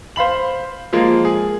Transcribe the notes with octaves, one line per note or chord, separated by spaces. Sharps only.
C5 F5 B5 F#7
F3 G#3 A#3
G#4